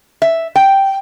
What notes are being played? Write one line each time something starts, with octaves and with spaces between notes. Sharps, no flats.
E5
G5